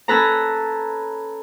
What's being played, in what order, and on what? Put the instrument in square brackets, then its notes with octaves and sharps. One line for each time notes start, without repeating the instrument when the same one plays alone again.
[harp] C#4 A4 B4 A#5